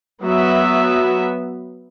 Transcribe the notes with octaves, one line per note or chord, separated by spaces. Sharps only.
F#3 B3 E5